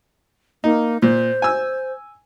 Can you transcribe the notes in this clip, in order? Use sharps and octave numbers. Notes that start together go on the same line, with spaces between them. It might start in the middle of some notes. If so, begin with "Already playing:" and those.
A#3 D#4
A#2 C5
G#5 E6